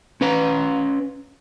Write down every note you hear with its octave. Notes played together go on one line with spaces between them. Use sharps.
C#4 B4 A#5